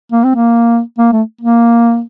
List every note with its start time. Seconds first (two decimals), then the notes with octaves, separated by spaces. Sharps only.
0.12 A#3
0.24 C4
0.36 A#3
0.98 A#3
1.12 A3
1.41 A#3